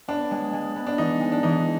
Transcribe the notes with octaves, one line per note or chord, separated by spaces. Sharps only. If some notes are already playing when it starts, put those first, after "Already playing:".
B3 D4
G#3
G#3
B3
D4
E3 D#4
G#3
D4
E3 D#4